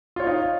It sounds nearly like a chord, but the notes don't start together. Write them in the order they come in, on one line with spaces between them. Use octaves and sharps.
F4 C#5 F5 D#4